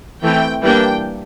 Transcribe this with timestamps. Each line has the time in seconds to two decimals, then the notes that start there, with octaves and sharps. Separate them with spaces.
0.23 E3 A3 C4 G5
0.62 E3 G3 A#3 D4 G5